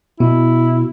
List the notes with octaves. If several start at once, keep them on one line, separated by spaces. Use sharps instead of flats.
B2 E4